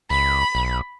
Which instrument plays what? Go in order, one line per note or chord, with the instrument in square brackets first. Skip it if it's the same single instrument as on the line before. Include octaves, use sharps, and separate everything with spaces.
[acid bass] C#2 [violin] B5
[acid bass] B1